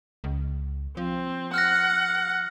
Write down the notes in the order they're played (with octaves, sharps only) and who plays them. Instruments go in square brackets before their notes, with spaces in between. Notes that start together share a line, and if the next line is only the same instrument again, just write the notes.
[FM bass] C#2
[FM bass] F3 [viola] C4
[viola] F#5 [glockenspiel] F6 F#6 A#6